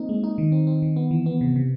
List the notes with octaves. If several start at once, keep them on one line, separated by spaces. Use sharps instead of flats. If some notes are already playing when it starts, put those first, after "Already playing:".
Already playing: A#3 C4 D#4
G#3
D#4
D#3
C4
C4
D#3
B3
E3
B3
C3
C3